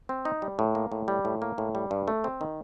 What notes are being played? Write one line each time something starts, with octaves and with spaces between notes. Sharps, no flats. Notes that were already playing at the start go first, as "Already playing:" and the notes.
C4
D#4
G3
A2
A#3
A2
G3
A2
A#3
A2
G3
G2
A3
C4
D#3